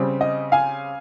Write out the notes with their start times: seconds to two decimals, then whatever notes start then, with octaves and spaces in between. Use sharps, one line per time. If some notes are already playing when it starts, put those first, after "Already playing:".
Already playing: C#3 G3 C4
0.21 D#5
0.52 F5 G#5